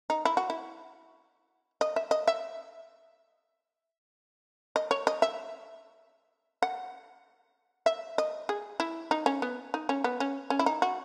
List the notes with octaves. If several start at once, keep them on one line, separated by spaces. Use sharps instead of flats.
D#4
E4
F#4
E4
D#5
E5
D#5
E5
D#5
C#5
D#5
E5
F#5
E5
D#5
G#4
E4
D#4
C#4
B3
D#4
C#4
B3
C#4
C#4
E4
D#4
F#4